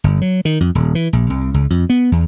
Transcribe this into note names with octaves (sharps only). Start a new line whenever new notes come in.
G1
F#3
D#3
F2
D#1
E3
A#1
C2
C#2
F2
B3
E2